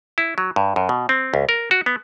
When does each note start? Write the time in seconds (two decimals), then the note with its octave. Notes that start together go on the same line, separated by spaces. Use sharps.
0.18 E4
0.38 F#3
0.56 G2
0.76 F#2
0.89 B2
1.09 C4
1.34 C#2
1.49 A#4
1.71 F#4
1.86 B3